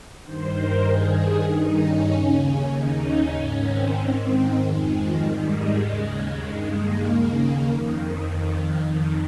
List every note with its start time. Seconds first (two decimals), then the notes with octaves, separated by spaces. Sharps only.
0.24 G2 D#3 C5
0.56 A#4
0.86 G2 D#3 G#4
1.47 G2 D#3 D#4
1.78 C#4
2.09 D#2 C#3
2.71 D#2 C#3 D#4
3.02 C#4
3.33 G#2 D#3
3.64 C4
3.94 G#2 D#3 C4
4.56 F2 D#3 G#3
4.88 F3
5.18 G#2 D#3 G3
5.49 G#3
5.80 D#2 C#3
6.11 G#3
6.41 G2 D#3
6.73 A#3
7.03 D#2 C#3
7.65 F2 D#3